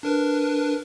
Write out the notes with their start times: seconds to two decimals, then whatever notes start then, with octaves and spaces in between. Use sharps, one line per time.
0.03 D4 A#4 B4